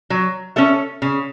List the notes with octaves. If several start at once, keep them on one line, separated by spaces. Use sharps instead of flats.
F#3
C#4 A4 E5
C#3